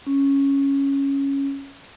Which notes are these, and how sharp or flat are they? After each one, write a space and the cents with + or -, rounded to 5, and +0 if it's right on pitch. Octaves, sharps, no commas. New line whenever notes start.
C#4 -5